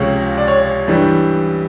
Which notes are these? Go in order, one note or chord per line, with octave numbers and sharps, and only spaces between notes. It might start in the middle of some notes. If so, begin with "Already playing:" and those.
Already playing: C#2 C3 F3 G#3 C#5
D5
C#5
G2 E3 G3